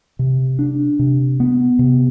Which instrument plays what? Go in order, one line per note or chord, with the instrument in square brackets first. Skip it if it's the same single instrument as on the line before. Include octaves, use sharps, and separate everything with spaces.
[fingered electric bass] C3
D4
C3
B3
C3